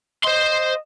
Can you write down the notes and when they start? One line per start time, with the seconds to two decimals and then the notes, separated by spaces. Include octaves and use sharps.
0.25 C5 D#5 C6